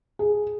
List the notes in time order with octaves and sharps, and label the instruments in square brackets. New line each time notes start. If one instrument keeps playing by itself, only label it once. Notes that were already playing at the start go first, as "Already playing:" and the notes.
[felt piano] G#4